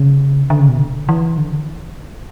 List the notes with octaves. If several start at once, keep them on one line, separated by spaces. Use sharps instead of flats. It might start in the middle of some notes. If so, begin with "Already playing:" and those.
Already playing: C#3
D3
C#3
B2
D3
E3
D3